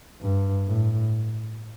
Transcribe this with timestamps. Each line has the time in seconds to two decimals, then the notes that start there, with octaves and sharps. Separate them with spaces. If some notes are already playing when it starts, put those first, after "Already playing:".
0.21 G2
0.67 A2